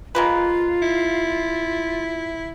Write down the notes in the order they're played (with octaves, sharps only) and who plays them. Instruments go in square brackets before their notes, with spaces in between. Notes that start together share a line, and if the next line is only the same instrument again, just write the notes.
[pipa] G#3 A#3 B4 [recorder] F4
[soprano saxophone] E4